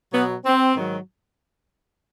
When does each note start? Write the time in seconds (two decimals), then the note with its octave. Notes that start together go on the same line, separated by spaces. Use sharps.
0.12 B2 F#3 B3
0.45 C4
0.76 G#2 D#3 F#3